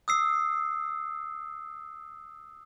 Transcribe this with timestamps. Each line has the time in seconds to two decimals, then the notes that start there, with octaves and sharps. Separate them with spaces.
0.08 D#6 E6 C7